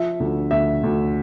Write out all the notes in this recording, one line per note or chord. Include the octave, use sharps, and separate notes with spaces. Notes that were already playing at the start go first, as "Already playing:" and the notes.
Already playing: F3 E5
D2
D2 E5
D2